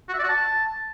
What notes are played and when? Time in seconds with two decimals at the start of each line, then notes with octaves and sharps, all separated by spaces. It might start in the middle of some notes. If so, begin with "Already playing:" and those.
0.09 F#4
0.14 E5
0.19 D5
0.24 F#4
0.29 A5